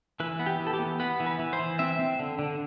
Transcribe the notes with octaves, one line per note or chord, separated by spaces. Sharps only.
E3 B4
B3
G4
E3
A4
G4
B3
B3 B4
E3
B4
E3
C5
E3
C4 E5
C4
D3
D3